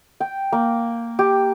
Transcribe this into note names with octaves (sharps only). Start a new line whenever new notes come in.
G5
A#3
G4